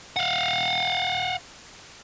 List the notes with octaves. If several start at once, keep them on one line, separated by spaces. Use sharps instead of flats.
F5 F#5